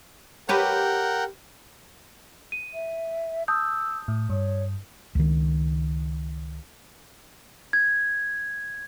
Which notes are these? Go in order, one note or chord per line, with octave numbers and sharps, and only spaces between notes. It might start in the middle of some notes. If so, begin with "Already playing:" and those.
G4 A#4 B4 C#5 F#5 G5
D#7
E5
A5 D#6 E6 G6
A2
G2 C#5
C#2 D#3
G#6